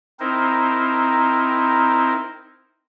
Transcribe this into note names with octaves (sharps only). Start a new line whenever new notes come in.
C4 D#4 E4 A#4 C5